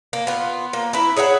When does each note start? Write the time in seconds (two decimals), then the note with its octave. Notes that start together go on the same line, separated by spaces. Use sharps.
0.13 A#3
0.27 B3 F4
0.73 A#3
0.93 E4 B4
1.16 G#4 C#5 E5 F#5